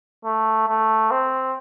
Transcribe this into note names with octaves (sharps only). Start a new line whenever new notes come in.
A3
A3
C4